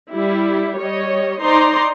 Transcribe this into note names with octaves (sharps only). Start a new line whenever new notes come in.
G3 E4
G3 C#5 D#5
D#4 C5 D5 A#5 C6